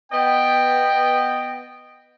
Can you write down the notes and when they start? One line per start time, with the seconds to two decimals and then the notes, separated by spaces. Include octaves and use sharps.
0.13 B3 D#5 G5